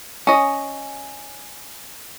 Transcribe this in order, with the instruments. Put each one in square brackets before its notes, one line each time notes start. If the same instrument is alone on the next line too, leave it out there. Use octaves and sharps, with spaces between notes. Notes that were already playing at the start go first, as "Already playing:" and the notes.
[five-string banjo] C#4 D#5